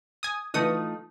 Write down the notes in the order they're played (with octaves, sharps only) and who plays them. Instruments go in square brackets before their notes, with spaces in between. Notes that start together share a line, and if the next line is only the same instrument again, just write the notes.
[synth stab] G#5 D#6
[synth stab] E3 D#6 [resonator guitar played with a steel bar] F3 A3 D#4